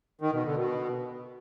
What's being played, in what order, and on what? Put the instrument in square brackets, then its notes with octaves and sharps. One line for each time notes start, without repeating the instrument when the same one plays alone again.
[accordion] D#3
B2
D3
B2